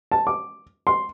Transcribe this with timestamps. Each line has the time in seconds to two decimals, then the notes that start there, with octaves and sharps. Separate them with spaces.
0.12 A5
0.27 D6
0.87 C6